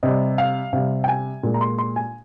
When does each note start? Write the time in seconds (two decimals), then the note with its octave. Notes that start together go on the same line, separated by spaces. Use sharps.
0.03 C3 G3 D#5
0.38 F5
0.73 C3 G3 F5
1.04 G5
1.08 G#5
1.43 A#2 G#3
1.54 A#5
1.61 C6
1.78 C6
1.96 G#5